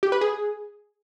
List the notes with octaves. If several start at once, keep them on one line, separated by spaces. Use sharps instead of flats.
G4
B4
G#4